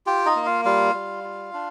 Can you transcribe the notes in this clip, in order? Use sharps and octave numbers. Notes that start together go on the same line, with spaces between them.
F4 G4 G5
D#4 D#5
A#3
F4 F5
G3 F4 F5
G3
F4
D4